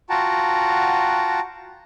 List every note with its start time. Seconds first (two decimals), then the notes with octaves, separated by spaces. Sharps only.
0.10 F4 F#4 F#5 G5 A5 A#5